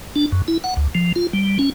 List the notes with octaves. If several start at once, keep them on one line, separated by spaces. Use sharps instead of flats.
D4
F#2
E4
F#5
D2
F3
F4
G3
C#4